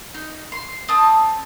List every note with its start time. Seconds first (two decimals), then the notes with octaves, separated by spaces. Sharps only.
0.14 D#4
0.52 C6
0.89 C4 A5 D#6